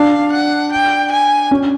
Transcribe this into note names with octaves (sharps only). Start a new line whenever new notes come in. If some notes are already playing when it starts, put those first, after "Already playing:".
Already playing: D4 F5
F#5
G5
G#5
C#4